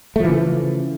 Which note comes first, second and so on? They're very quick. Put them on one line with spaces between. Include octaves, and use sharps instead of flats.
A3 F3 E3 C#3